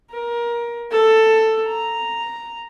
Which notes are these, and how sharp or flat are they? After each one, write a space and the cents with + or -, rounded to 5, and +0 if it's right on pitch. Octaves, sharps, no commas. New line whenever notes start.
A#4 +20
A4 +10
A#5 +0